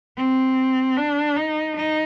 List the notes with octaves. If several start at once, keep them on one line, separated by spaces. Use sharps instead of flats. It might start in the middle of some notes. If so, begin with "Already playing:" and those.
C4
D4
D#4
D#4